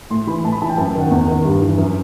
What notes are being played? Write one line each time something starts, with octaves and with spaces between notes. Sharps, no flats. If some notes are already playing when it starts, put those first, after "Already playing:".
A2 C6
E3 B5
A2 A5
B5
E3 A5
G5
F#2 A5
G5
D#3 F#5
E2
D#3
G2
E3
F#2